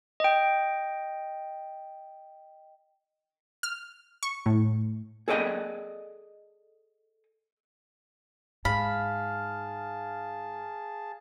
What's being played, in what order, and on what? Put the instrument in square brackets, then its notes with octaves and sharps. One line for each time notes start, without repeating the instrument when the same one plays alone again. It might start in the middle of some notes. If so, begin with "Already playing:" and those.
[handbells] D#5 G5
[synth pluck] F6
C#6
A2
[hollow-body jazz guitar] G#4 A4 D5 D#5 G5
[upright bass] G#2 [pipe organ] G#4 A5 [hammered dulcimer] F5 [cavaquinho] B5